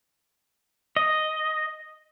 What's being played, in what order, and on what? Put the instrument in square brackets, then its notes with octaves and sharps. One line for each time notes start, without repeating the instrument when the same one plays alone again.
[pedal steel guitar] D#5